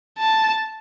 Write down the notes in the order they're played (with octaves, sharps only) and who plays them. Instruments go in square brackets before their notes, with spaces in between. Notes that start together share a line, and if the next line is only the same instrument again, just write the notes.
[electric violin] A5